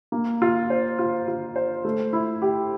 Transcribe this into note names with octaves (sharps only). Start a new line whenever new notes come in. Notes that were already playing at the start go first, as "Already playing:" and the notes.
A#3
F4
C5
F4
F4
C5
A3
E4
G4